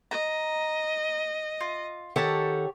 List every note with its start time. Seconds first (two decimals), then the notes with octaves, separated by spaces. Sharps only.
0.11 D#5 A#5
1.61 F4
2.16 D#3 G4 A4 C#5 F#5 A5